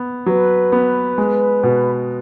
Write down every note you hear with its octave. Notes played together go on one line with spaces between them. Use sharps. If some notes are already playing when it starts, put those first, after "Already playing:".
Already playing: B3
F#3 B4
B3
G#3
B2